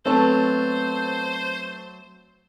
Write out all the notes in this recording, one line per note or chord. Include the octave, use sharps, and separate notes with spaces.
F#3 A3 B3 C4 A4 C5 C#5 A5